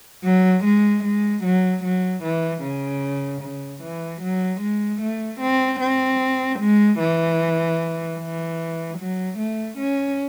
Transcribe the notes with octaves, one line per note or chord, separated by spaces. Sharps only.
F#3
G#3
G#3
F#3
F#3
E3
C#3
C#3
E3
F#3
G#3
A3
C4
C4
G#3
E3
E3
F#3
A3
C#4